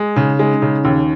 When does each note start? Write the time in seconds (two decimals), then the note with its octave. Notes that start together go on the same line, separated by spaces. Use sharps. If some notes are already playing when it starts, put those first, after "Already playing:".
Already playing: G#3
0.16 C#3 D#4
0.39 G#3 D#4
0.54 C#4
0.62 C#3 D#4
0.84 D#2 C#4